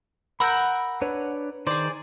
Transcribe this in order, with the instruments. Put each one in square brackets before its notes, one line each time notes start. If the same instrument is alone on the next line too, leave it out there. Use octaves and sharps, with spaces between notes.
[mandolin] A#4 F#5 E6 [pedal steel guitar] B5 F#6 G6
[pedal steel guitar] D4 B4 C#5
[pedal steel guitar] D#3 C5 [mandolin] G#4 D5